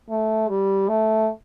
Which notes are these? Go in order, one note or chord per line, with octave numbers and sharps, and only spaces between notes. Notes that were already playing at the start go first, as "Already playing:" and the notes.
A3
G3
A3